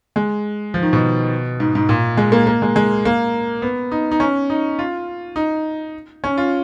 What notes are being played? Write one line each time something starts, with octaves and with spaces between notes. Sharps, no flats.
G#3
F3
D#3
B2
G#2
G#2
A#2
G#3
A#3
A#3
G#3
G#3
A#3
B3
D#4
D#4
C#4
D#4
F4
D#4
C#4
F4